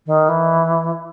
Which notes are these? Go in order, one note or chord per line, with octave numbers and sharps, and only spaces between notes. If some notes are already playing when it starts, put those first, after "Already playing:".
D#3
E3